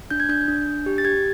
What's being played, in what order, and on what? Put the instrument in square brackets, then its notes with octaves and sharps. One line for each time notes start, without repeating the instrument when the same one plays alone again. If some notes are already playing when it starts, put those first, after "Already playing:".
[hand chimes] D4 G6
G#6
D4 G6
D4
D4
G4
A6
G4 G#6